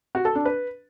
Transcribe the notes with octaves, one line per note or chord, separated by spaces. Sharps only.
F#4
A4
D4
B4